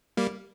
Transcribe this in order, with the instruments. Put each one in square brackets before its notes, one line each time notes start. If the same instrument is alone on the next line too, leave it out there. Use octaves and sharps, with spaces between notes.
[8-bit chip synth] G3 A#3